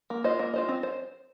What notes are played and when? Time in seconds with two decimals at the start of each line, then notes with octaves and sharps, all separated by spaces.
0.10 A#3
0.24 F4 C5 D#5
0.39 A#3
0.54 F4 C5 D#5
0.69 C4
0.83 C5